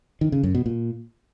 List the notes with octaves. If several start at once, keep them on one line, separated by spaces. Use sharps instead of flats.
D#3
C#3
F#2
B2
A#2